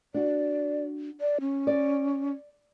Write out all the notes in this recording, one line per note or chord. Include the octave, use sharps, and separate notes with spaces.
D4 F#4 D5
D5
C#4
D5